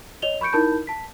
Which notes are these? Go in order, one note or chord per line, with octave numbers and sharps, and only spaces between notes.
C#5 D#5 F7 G7
B5 C#6 G6 C#7 D7
D#4 E4 A#4 A5 B5 G6
A5 B6